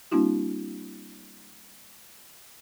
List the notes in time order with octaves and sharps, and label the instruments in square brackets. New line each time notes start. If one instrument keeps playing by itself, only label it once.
[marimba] G3 A#3 C4 D4 E4 F#4